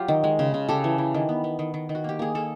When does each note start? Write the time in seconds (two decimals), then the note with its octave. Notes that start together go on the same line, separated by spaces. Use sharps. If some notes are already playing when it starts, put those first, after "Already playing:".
Already playing: F#3 F4 G4
0.08 D#3
0.24 G#3
0.39 C#3
0.54 C#3
0.69 C#3 G4 A4
0.84 E3
0.98 E3
1.14 D#3
1.29 B3
1.44 B3
1.59 D#3
1.74 D#3
1.89 D#3
1.95 F#4
2.04 A#3 G4
2.19 A#3 G#4
2.35 A#3 A4